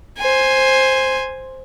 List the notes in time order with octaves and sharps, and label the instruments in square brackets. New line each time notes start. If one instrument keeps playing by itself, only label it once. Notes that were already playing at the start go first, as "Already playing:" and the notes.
[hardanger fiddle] C5 G#5